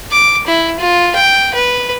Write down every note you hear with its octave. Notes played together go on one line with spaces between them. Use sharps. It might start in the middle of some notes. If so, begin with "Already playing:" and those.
D6
E4
F4
G5
B4